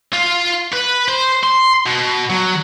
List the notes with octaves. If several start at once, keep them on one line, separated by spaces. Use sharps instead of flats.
F4
B4
C5
C6
B2
F#3